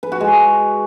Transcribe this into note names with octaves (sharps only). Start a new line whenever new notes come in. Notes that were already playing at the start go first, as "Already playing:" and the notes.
B4
F#4
G#3